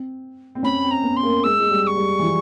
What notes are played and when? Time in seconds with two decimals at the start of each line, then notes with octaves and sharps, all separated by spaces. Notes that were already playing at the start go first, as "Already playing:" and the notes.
Already playing: C4
0.55 C4
0.63 C#4 B5
0.84 C4
0.91 A#5
1.04 B3
1.16 C6
1.23 A#3
1.43 G#3 E6
1.60 G#3
1.71 G3
1.83 E6
1.87 C#6
1.97 G3
2.19 E3
2.23 F3